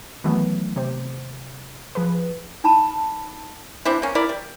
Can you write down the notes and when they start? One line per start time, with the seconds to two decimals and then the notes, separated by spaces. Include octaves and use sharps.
0.24 D#3 E3 F#3 A3 B3
0.76 C3 G4 C5
1.95 F3 G#4 B4
2.64 D#4 A5 B5
3.85 C4 D4 E4
4.02 A#3 C#4
4.15 E4 A#4 D5
4.29 G3